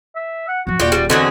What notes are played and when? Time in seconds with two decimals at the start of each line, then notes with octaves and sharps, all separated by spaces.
0.16 E5
0.48 F#5
0.67 F2 F3 F#4
0.80 D#1 F4 G4 D5
0.92 G3
1.10 E2 D3 F#3 C4 F4 F#4 G#4 D#5